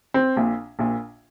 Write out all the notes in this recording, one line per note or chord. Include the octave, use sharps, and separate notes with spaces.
C4
A#1 A#2
A#1 A#2